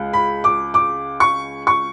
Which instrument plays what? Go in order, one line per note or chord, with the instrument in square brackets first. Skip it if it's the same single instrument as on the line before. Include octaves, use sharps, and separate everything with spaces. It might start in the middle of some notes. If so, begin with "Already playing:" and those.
Already playing: [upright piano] C#2 G#3
B5
D6
D6
C#6
C#6